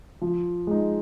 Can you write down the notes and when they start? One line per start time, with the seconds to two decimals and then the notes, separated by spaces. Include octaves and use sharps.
0.21 F3
0.67 G#3 D#4